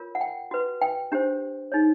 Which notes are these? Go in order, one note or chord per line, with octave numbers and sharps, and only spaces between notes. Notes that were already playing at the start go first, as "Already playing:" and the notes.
Already playing: F4 A#4 C#5
F#5
G5
F#4 B4
G5
D4 G4 C5
D#4 G#4 C#5